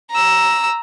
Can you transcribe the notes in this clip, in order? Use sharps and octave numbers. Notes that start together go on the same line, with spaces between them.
A#5 E6